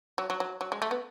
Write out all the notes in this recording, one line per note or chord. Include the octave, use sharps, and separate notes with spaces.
F#3
F#3
F#3
F#3
G#3
A3
B3